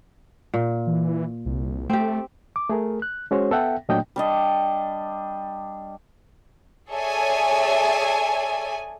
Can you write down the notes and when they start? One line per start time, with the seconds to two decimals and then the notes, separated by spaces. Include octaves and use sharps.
0.54 A#2
0.87 E3
1.45 C2
1.90 A3 C4 G4
2.56 D6
2.69 A3 G#4 A#4
3.02 F#6
3.31 G#3 C#4 F#4 G#4 C5 C#5
3.51 B3 A4 E5 F#5 G5
3.89 A#2 F#3 A3 D4 D#5 G5
4.16 G3 D4 D#5
6.91 G#4 A4 C#5 D5 E5 G#5